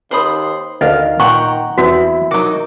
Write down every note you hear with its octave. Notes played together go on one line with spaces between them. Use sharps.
D#2 C5 B5 D#6
D2 D#3 D4 A#4 D#5 F5
A#2 F#5 G5 A#5 C#6
E2 B3 C4 E4 F#4
F#3 D#4 F#4 A#4 D6